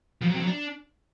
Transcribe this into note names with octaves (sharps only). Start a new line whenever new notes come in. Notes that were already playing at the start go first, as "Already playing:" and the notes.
F3
F#3
C4
F#3
D4